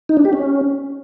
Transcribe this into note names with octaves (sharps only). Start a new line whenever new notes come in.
D#4
D4
G4
C#4